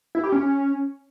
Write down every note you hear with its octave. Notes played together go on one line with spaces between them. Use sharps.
E4
G4
C#4